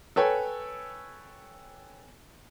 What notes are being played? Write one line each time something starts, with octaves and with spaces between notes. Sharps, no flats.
A4 B4 C#5 G5 G#5